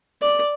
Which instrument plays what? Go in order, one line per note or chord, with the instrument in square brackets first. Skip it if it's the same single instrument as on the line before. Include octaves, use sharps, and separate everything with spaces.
[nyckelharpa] D5